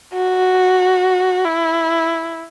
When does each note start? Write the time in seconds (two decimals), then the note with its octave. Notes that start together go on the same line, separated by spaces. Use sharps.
0.14 F#4
1.45 E4